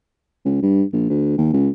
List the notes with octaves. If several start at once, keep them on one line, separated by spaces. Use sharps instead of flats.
C#2
G2
A#1
D2
D#2
C#2